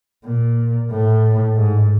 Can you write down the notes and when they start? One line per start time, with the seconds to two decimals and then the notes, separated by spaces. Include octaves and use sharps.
0.25 A#2
0.91 A2
1.57 G#2